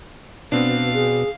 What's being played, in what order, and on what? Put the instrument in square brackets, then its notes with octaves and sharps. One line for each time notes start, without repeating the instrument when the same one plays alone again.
[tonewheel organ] B2 [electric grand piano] B3 C4 D4 [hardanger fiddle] F5
[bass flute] G#4